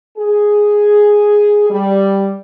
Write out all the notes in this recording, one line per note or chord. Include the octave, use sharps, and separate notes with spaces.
G#4
G3